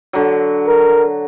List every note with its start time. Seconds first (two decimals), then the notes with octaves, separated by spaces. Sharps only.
0.13 D3 F#3
0.68 A#4